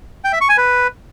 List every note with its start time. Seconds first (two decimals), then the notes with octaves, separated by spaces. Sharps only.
0.24 G5
0.33 E5
0.41 C#6
0.49 G#5
0.57 B4